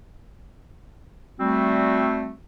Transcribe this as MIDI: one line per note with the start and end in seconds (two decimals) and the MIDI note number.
1.40 2.32 55
1.40 2.32 57
1.40 2.32 60
1.40 2.32 66